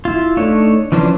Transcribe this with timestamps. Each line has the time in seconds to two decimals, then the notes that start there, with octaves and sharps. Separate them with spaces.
0.05 E4 F4
0.37 A3 D4 D#4 C#5
0.92 E3 F3 C#4 D4 C5